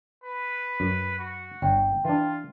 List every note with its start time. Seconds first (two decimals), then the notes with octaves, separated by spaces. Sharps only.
0.24 B4
0.80 F#2
1.19 F#4
1.62 G1 C#5 G5
2.05 E3 D4 F4